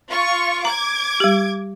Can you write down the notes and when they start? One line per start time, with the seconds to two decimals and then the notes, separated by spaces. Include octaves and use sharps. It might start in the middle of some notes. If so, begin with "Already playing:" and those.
0.10 F4 C#6
0.65 A#5 D6 G#6
1.20 G3 G4